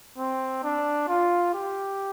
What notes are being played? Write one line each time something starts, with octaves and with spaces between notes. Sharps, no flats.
C4
D4
F4
G4